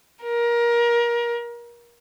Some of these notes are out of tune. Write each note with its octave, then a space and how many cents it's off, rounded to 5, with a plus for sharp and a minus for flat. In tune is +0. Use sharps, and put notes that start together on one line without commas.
A#4 +25